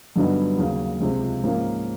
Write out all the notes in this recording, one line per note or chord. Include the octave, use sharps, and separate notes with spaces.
G2 D3 F#3 B3 D#4
D#2 C#3 F#3
C#2 C3 F3 G#3
G#2 F3 A#3 C#4